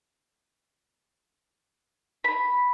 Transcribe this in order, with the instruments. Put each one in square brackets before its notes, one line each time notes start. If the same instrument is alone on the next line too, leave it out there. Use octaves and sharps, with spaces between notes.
[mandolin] B5